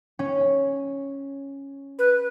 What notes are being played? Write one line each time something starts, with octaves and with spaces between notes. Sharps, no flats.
C#4
B4